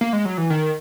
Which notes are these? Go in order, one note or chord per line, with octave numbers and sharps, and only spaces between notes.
A#3
G#3
F#3
E3
D#3